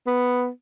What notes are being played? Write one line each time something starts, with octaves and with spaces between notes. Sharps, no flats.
B3